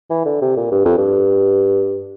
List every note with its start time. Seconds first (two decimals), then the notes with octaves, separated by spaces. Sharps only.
0.10 E3
0.25 D3
0.41 C3
0.56 A#2
0.71 G2
0.85 F2
0.97 G2